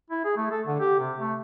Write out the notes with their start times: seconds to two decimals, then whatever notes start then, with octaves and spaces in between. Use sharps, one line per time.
0.10 E4
0.25 G#4
0.37 A3
0.51 A4
0.67 D3
0.80 G4
0.99 C3
1.19 A3